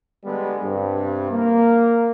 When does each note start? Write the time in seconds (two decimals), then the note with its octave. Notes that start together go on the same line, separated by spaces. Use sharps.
0.24 D3 G3 G#3 B3
0.62 G2 C3
1.31 A#3